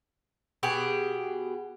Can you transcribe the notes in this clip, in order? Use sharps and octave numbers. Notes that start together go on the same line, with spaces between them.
B2 G4 G#4